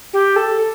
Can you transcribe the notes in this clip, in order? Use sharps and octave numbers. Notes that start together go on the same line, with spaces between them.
G4
A4